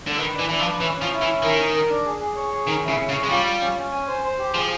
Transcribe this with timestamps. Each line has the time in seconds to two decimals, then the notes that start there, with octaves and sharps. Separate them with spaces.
0.07 D3
0.18 D#3 B4
0.34 D4
0.39 E3
0.49 E3 D4
0.60 F3
0.65 B4
0.80 E3 C#4
0.96 C#4
1.02 F3
1.12 E4
1.22 E3
1.27 C#4
1.42 D#3 A#4
1.58 A#4
1.74 A#4
1.89 D4
2.05 G#4
2.21 G#4
2.36 C#5
2.52 G#4
2.67 D#3 C#4
2.83 E4
2.88 C#3
2.98 C#4
3.09 C#3
3.14 C#5
3.23 G#3
3.29 G3 F4
3.45 F4
3.61 C#4
3.77 C#4
3.92 G#5
4.08 C5
4.23 C5
4.39 G4
4.54 F3 G#4